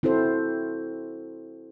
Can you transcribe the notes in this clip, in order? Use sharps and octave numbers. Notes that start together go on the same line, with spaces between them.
C4 E4 F#4 A4 C5